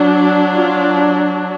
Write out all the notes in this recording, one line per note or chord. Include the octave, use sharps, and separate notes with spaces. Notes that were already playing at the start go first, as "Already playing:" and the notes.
Already playing: F#3 D4
F4